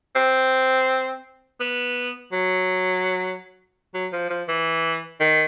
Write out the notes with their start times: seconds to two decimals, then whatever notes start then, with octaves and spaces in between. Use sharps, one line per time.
0.16 C4
1.60 B3
2.32 F#3
3.94 F#3
4.13 F3
4.30 F3
4.48 E3
5.20 D#3